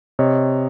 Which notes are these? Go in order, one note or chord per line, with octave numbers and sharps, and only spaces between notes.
C3 C#5 D#5